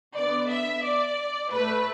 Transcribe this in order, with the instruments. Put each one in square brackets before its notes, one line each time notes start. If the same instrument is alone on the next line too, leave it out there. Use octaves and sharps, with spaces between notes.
[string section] D3 B3 D5
E5
D5
A2 A3 B4